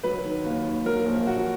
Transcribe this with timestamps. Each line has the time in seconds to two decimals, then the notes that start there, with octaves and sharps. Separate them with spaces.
0.03 F#3 B4
0.24 D#3
0.45 D#2
0.65 D#2
0.86 F#3 A#4
1.06 A#1
1.27 A#1 F#4